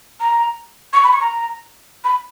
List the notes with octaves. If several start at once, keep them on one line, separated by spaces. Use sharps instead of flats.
A#5
C#6
B5
C#6
A#5
B5